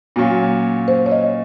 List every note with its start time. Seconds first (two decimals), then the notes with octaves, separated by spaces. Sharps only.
0.16 A#2 F#3 C#4 F4 F#4
0.88 C5
1.06 C#5
1.11 D#5